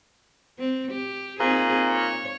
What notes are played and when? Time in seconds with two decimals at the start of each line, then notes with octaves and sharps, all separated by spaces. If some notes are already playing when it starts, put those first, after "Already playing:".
0.59 C4
0.92 G4
1.40 A#2 C4 D#4 G#4
1.91 C#5